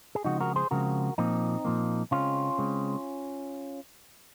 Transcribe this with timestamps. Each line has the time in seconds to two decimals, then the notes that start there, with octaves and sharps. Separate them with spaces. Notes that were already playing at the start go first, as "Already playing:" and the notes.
0.15 G#4
0.24 C#3 F3 G#3 C4 D#4 F#4
0.41 F#4 A#4
0.56 G#4 C5
0.71 C#3 F3 G#3 C4 F#4 A#4
1.18 A#2 F3 A#3 C4 D#4
1.65 A#2 F3 A#3
2.11 C#3 G#3 C4 C#4 F4
2.58 C#3 G#3 C4